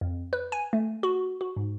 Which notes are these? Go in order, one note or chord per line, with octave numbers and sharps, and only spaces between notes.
F2
B4
G#5
A3
F#4
F#4
G#2